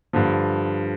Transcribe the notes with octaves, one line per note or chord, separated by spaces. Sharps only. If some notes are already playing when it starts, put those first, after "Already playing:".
G2 D3 F3